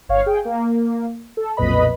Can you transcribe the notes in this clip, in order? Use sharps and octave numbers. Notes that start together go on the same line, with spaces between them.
G1 C#5 F5
G#4 G5
A#3
A4
B1 F2 A#2 B4 D#5 B5